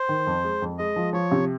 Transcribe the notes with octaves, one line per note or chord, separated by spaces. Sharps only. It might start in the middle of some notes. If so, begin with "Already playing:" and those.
Already playing: C5
D#3
F2
G#3
F2
G#3 D#5
F3
F3 C#5
C3